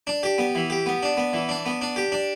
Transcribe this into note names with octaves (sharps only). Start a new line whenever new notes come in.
D4
G4
B3
E3
G4
B3
D4
B3
E3
D4
B3
D4
G4
D4